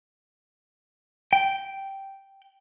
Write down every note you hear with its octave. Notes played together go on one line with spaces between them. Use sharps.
G5